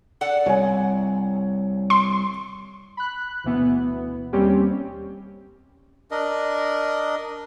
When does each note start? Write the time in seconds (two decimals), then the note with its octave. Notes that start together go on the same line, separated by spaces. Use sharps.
0.21 A4 D5 F#5
0.46 C2 C#5 G#5
1.90 C6
2.97 B5 F#6
3.44 D2 B2 E3 B3
4.33 D#2 G3 C4 C#4 G4
6.11 D4 A#4 D#5